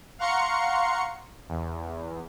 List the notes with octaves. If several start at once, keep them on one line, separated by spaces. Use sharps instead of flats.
F5 F#5 A#5 C6 C#6 C#7
E2